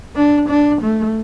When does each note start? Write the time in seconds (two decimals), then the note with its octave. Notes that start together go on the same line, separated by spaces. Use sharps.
0.16 D4
0.49 D4
0.82 A3